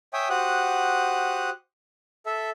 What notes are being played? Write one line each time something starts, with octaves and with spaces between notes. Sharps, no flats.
C#5 E5 G5 G#5 D#6
F#4 G4 C5 F#5 D#6 F#6
A4 E5